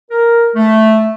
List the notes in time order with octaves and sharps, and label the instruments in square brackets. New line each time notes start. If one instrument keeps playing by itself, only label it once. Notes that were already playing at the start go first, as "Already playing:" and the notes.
[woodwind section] A#4
A3